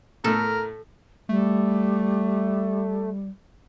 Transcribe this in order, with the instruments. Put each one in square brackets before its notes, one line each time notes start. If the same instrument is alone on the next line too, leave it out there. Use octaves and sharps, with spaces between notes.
[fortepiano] A2 A3 [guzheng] A4 [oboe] A#4
[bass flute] G3 [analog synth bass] A3